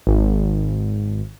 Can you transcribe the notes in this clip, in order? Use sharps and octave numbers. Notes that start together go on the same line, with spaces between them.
G#1